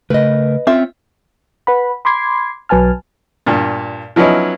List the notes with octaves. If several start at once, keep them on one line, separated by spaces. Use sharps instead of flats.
C#3 A3 A#4 B4 D#5
C4 C#4 F4 E5
B4 F#5 B5
B5 C6 D6 G#6 C7
B1 F#3 B4 G#5 A5 F6
G2 A#2
F3 F#3 B3 C#4 D#4 E4